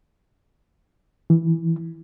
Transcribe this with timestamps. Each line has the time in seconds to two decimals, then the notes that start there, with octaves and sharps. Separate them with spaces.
1.30 E3